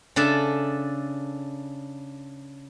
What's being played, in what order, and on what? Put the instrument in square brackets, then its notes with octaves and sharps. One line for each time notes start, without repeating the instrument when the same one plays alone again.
[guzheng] C#3 D4 A4 E5